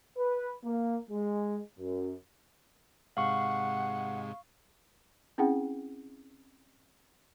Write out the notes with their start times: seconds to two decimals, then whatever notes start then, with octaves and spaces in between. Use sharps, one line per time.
0.17 B4
0.64 A#3
1.10 G#3
1.78 F#2
3.17 G#2 C3 G#3 F5 F#5 C#6
5.38 C4 C#4 E4 G#4 F#5 G5